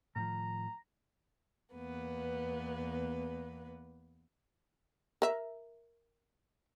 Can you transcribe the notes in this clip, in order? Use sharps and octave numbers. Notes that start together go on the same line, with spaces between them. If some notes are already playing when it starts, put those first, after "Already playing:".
A2 D#3 F3 A#5
E2 A#3 B3 B4
A#4 E5